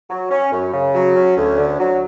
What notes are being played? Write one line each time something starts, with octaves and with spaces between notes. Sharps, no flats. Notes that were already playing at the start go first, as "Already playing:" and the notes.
F#3
C#4
F#2
C#3
F#3
C#4
D2
D3
F#3